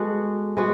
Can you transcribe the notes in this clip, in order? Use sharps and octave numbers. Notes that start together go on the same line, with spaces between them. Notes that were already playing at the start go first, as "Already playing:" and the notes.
Already playing: G#3 B3 F#4 A4
G#3 B3 F#4